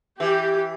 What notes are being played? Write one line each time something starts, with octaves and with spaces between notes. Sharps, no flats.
E3 G4